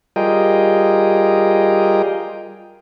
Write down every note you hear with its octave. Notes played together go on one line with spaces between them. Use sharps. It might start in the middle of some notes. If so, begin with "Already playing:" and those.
G3 F4 G#4 A#4 D#5 G5